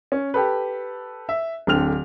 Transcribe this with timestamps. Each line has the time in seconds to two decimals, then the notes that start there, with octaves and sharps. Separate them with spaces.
0.12 C#4
0.34 G4 A4 B4
1.29 E5
1.67 D1 D3 C4 F6 F7